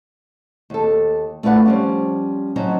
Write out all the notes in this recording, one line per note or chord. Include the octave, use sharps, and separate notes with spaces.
D#2 A4
A3 D4 F4 B4 F#5
F3 G3 C#4
F3 F#3 C#4 D#4 F#4